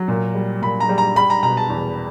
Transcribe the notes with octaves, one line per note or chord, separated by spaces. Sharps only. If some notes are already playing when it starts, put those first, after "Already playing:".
Already playing: F#3
A#2
G3
A#2 B5
A#5
G3
A#5
G3 B5
A#5
B2 A#5
A5
E2